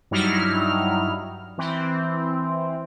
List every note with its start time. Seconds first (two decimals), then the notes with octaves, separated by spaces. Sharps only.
0.11 G2 F#3 G3 D#4 E4 F6
1.58 E3 C4